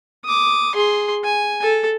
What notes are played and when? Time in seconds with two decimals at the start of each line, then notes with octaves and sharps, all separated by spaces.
0.25 D6 D#6
0.75 G#4 C6
1.24 G#5
1.63 A4